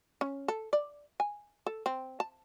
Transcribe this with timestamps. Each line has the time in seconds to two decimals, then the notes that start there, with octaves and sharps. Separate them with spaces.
0.21 C#4
0.48 A4
0.73 D5
1.20 G#5
1.66 A4
1.86 C4
2.20 A5